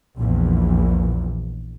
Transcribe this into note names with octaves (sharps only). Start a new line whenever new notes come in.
A#1 E2